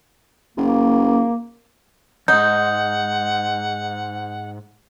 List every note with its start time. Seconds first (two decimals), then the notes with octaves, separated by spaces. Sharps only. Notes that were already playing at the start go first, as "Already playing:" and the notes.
0.57 F#1 A#3
2.28 F2 G#2 D#4 F#5 G6